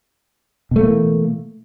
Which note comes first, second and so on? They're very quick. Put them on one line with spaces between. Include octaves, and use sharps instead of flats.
B2 A3 A#3 E3